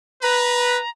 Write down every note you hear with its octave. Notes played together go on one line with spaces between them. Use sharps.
B4 A#5